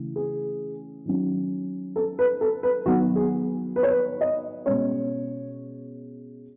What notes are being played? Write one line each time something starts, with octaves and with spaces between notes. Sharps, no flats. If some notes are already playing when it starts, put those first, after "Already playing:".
Already playing: C#3 E3 A3
G#4
D#3 F#3 C#4
A4
B4
A4
B4
D#3 F#3 B3 F#4
G#4
B4
C#5
B4
D#5
B2 G#3 C#4 C#5